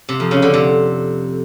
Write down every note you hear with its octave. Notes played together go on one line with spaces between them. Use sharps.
C3
F2
C#3
D3
C3